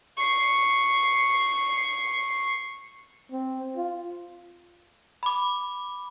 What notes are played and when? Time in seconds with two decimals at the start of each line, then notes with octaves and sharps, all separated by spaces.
0.17 C#6 C7
3.32 C4
3.76 F4
5.23 B5 D6